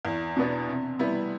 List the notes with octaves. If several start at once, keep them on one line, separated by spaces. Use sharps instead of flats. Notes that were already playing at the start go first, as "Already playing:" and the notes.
E2
B2 B3 D4
C3
G3 B3 E4